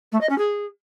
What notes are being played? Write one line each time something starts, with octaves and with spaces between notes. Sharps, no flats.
A3
D#5
C#4
G#4